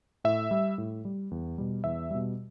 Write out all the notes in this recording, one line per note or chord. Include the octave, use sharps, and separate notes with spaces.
A2 E5
G3
A2
G3
E2
B2 G3
E2 E5
B2 G3